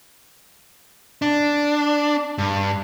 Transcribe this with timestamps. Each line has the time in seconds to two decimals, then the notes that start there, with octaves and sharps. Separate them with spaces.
1.22 D4
2.38 G2